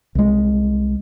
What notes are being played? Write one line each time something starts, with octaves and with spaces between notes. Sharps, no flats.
C2 G#3